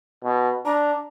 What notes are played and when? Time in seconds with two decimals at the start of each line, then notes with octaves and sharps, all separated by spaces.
0.24 B2
0.66 D4 A#5